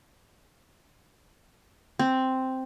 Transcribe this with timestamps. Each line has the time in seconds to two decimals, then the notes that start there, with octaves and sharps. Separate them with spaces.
1.99 C4